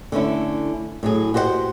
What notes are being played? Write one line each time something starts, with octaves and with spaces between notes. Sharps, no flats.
D3 A3 C#4 E4
A2 F#3 G#4
F#4 G4 C5 D5 F#5